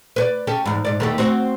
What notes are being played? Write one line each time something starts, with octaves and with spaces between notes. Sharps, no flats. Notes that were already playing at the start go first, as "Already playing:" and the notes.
B4 C#5 D5
C#4 G4 A4
E2 G#2
G#2 D5
D#2 A3 G4
C4 F#4 C#5